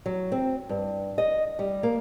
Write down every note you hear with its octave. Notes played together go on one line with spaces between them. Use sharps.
F#3
C4
G2
D#5
G3
A#3